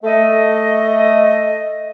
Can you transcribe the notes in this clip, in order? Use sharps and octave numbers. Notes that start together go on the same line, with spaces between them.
A3 D#5